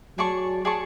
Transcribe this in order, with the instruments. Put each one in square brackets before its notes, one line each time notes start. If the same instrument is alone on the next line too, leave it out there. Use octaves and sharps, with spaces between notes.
[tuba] F#3 [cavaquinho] G#4 D5 A5 C#6
[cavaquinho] G#4 D5 A5 C#6